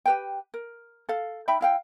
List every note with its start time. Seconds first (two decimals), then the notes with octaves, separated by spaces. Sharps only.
0.06 G4 B4 G5
0.54 A#4
1.09 A4 F5
1.48 D#4 E5 G5 B5
1.61 E4 F5 G5